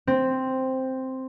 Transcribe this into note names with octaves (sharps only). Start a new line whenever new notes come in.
C4